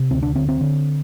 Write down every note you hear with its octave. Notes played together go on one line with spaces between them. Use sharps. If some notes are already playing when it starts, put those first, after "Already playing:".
Already playing: C3
D2 C4
D4
D3 C4
C4
D3